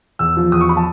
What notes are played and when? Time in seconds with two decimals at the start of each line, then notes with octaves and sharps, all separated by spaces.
0.19 E2 E6
0.37 F3
0.52 E2 D#6
0.61 C#6
0.68 F3 B5
0.77 A5